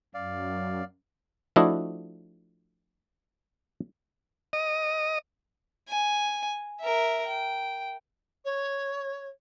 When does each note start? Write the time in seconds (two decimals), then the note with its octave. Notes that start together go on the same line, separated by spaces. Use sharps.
0.14 F#2 D5 F5
1.56 F3 A3 D4 E4 F#4 D#5
4.53 D#5
5.88 G#5
6.80 A#4 E5
7.26 G5
8.45 C#5